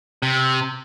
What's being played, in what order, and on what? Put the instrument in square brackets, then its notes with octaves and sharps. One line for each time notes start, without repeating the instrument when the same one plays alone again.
[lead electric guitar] C3